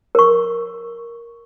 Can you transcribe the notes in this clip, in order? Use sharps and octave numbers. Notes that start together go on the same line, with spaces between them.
A#4 C#6